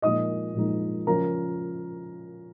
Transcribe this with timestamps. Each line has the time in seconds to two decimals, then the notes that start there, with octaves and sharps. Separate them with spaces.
0.02 A#2 F3 G#3 D#4 D#5 D#6
0.55 A#2 F3 G#3 D#4
1.07 C#3 F3 C#4 A#4 A#5